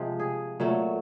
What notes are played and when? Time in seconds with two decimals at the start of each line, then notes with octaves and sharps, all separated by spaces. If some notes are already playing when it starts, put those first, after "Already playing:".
Already playing: C3 F3 G#3 G4
0.20 G#4
0.60 A#2 F#3 A3